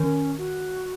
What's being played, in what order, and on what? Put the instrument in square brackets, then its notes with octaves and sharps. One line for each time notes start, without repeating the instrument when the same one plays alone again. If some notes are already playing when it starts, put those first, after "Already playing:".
Already playing: [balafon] D#3 [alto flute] C#4
[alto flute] F#4